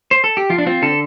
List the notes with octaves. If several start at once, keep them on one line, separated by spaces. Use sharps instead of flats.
C5
A4
G4
F3 F4
D4
C4 F4
D3 A4